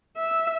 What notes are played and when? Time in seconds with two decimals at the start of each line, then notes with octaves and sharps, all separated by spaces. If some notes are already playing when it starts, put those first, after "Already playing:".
0.17 E5